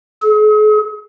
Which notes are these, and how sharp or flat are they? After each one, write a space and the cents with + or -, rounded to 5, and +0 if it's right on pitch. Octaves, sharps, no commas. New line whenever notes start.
G#4 +45